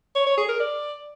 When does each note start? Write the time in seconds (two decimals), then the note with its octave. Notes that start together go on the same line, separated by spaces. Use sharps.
0.15 C#5
0.27 C#5
0.38 G#4
0.49 A#4
0.60 D5